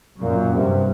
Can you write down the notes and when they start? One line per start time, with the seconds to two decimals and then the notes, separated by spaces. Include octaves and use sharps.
0.21 F#2 A#2
0.54 G2 C3